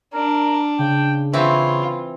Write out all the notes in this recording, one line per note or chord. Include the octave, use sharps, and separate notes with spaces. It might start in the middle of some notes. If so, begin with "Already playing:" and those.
D4 A#4
C#3 G5
E3 C4 E4 F4 C#5